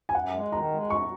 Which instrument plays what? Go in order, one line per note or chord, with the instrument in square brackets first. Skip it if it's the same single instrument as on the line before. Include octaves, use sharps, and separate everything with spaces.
[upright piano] G#5
[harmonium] F#2 [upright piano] F#5
[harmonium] G#3
[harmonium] D#3 [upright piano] A#5
[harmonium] G#3
[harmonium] F#2 [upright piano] C#6